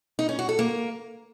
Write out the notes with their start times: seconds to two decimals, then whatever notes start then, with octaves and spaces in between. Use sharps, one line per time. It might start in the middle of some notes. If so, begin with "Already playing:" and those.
0.19 D#4
0.29 C#4
0.39 F#4
0.49 A4
0.59 A#3